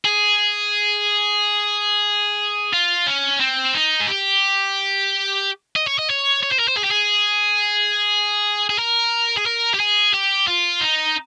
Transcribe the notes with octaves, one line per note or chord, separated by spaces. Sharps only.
G#4
F4
C#4
C4
D#4
G#4
G4
D#5
C#5
D#5
C#5
C#5
C5
A#4
C5
G#4
G4
G#4
G#4
A#4
G#4
A#4
G4
G#4
G4
F4
D#4